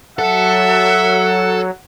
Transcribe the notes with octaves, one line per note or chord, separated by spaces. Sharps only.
F#3 A4 E5 F#5